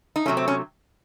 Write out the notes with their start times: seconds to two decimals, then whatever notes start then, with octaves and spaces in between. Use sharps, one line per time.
0.16 D#4
0.26 C3 F#3 A3 C#4
0.37 C4
0.48 C#4